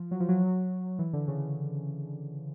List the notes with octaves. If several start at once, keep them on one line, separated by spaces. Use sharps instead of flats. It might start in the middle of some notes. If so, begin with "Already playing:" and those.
Already playing: F3
F#3
F3
F#3
E3
D3
C#3